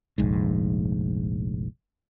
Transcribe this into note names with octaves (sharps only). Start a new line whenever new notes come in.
F1 A#1 G#2